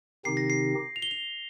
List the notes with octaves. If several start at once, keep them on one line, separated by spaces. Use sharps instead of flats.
C3 D#3 C4 D#4 G4 C7
A#6
C7
F7
G7
F7